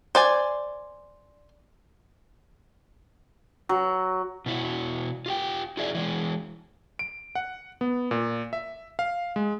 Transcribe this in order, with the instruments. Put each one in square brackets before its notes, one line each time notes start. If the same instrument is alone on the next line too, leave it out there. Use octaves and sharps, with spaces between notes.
[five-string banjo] C5 D5 G#5
[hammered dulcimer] F#3
[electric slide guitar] B2 E4 F#4
F4 G4 G5
E4 F#4 G#4 D5 E5
E3 G#3
[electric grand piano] D7
F#5
B3
A#2
E5
F5
G#3